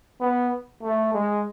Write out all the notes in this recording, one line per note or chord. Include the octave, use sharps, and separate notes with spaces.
B3
A3
G#3